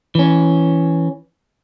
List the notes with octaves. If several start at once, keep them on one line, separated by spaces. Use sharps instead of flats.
E3 C#4